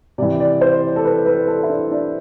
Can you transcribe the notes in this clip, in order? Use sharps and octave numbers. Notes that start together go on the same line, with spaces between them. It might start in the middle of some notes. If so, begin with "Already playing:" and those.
C3 E3 D5
D5
C5
A4
B4
B4
A4
E4
D4
D4